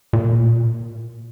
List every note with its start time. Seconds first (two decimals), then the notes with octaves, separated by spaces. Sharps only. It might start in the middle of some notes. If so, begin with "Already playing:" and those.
0.13 A#2